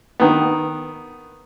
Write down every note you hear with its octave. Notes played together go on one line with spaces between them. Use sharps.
D#3 B3